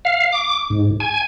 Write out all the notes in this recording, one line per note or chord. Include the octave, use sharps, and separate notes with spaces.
F5
D6
G#2
G#5